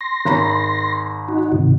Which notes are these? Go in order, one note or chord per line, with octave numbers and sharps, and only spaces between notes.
C6 A#6
G#1 A#5 B5
D#4 F#4
G#2 C3 D#3